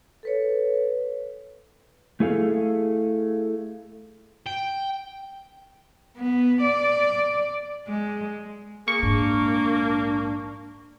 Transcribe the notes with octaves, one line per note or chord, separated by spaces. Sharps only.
A4 B4 C#5
A3 E4 G#4 A4 F5
G5
B3
D5
G#3
A#3 G#4 C#6
A#1 G#2 D4